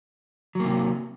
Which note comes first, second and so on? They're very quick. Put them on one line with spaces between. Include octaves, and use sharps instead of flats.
F#3 A#3 C3